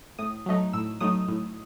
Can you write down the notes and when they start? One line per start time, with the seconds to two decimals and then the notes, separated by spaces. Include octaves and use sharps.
0.19 A2 D#6
0.46 F#3 A3 D#4
0.73 A2 E6
1.00 F#3 A3 D#4 D#6
1.28 A2